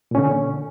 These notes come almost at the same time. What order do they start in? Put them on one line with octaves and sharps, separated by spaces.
A#2 C#4 D3